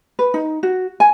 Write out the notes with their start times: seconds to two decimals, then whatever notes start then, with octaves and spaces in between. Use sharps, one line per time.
0.19 B4
0.34 D#4
0.63 F#4
1.00 G#5